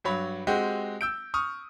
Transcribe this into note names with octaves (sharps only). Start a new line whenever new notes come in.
G2 F#3 C#5 B5
G#3 C4 F#4 G4
E6 G6 D7
C#6 D#6 F6